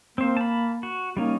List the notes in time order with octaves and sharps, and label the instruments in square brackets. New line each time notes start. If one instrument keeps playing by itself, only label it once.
[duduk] A#3 [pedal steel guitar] C4 C5
[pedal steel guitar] A5 B5
F#4
[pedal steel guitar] G3 C#4 D#4 [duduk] A#3